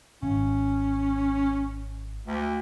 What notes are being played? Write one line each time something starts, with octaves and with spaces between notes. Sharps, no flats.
G#1 C#4
D2